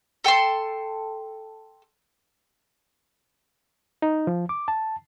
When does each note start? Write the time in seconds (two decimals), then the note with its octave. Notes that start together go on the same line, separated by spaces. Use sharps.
0.24 A4 G5 A5 C6
4.02 D#4
4.27 F3
4.49 D6
4.68 A5